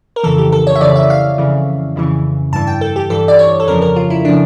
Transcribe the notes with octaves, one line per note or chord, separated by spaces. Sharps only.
A#4
F2 C#3 E3 A4
G4
A4
C#5
E5
F2 C#3 E3 D5
E5
F5
F2 C#3 E3
F2 C#3 E3
G2 E3 A5
G5
A4
G4
G2 E3 A4
D5
C#5
A4
F2 C#3 F3 A#4
A#4
F4
E4
C#3 F3 D4